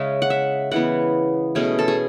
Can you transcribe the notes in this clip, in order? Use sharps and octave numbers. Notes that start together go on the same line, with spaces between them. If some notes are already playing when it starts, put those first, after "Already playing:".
Already playing: C#3 G#3 C#4 E5
F#5
E5
C#3 E3 B3 F#5
B2 A3 C#4 G#4
A4
G#4